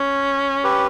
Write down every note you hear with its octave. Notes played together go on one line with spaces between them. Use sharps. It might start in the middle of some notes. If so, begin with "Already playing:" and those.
Already playing: C#4
G4 B4